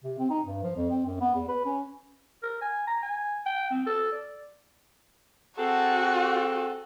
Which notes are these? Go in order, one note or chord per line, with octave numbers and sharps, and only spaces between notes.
C3
C4
D#4
G2
F3
F2
C4
F#2
B3
E2
B4
C#4
A#4
G#5
A#5
G#5
G5
C4
A4
D5
C4 F#4 G#4 A4